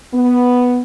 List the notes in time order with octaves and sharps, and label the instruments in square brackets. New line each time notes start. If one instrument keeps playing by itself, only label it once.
[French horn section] B3